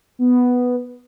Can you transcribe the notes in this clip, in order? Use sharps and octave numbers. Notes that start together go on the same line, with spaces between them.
B3